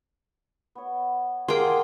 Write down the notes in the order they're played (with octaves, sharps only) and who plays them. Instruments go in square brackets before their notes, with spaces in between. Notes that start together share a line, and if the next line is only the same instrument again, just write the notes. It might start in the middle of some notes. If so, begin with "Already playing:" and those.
[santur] B3 C#5
[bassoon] A#3 [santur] G4 D5 F#5 [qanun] G#4 G5 [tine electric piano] A#4 C6